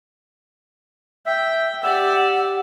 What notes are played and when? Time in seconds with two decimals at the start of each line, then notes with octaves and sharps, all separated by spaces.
1.26 E5 G5
1.84 G4 D5 F#5 E6